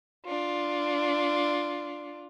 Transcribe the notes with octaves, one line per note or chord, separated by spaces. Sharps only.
D4 F4